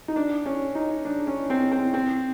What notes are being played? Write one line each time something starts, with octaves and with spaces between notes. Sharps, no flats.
D#4
D4
C#4
D#4
D4
C#4
C4
C4
C4